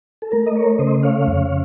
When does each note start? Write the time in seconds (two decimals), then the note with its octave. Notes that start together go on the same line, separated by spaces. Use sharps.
0.22 A4
0.32 A3 A#4
0.46 D#5
0.55 A#4 C#5
0.79 C#3 C5 D#5
1.03 C#5 F5
1.27 F2